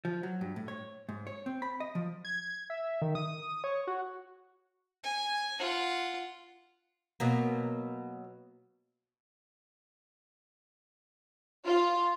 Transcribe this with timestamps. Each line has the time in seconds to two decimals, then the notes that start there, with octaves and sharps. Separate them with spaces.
0.05 F3
0.23 F#3
0.41 G2
0.56 A2
0.68 C#5
1.09 G#2
1.27 C#5
1.46 C4
1.62 B5
1.80 D#5
1.95 F3
2.25 G#6
2.70 E5
3.02 D#3
3.15 D#6
3.64 C#5
3.87 F#4
5.04 G#5
5.60 F4 F#5
7.20 B2 F#3 A#3
11.66 F4